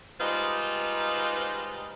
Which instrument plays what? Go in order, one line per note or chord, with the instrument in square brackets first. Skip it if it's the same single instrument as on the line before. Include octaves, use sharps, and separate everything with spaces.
[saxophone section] G3 G#3 D#4 F4 B4 C5